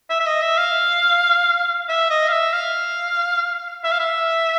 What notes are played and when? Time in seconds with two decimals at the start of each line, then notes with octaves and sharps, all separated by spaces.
0.10 E5
0.20 E5
0.26 D#5
0.42 E5
0.58 F5
1.89 E5
2.10 D#5
2.28 F5
2.32 E5
2.53 F5
3.84 E5
3.92 F5
3.99 E5